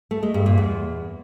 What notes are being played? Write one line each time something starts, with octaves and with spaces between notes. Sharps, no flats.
A3
G#3
G2
A#2
E2